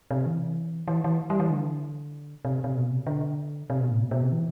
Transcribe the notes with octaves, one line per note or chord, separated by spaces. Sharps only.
C3
E3
E3
E3
G3
E3
D3
C3
C3
B2
C3
D3
C3
B2
A2
B2
B2
C3
E3